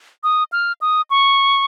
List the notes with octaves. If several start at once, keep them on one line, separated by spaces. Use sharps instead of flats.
D#6
F6
D#6
C#6